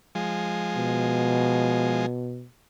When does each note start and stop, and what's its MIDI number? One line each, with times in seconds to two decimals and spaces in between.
0.15 2.06 53
0.15 2.06 56
0.76 2.46 47